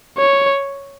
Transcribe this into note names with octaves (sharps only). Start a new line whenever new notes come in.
C#5